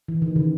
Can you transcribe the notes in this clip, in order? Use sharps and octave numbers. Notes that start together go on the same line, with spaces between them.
E3
D#3
C#3